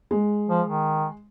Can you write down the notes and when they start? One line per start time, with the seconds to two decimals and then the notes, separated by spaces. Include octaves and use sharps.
0.11 G#3
0.49 F3
0.67 D#3